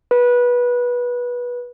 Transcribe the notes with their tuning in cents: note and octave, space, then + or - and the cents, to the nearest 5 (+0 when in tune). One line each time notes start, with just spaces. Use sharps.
B4 -20